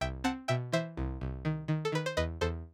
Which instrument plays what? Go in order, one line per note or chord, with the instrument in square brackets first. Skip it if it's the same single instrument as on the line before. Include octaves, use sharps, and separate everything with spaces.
[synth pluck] C2 E5 G5
C4 F#5 A5
B2 E5 G5
E3 C5 E5
C2
C2
D#3
D#3
A4
D#3 B4
C5
E2 B4 D#5
E2 A4 C5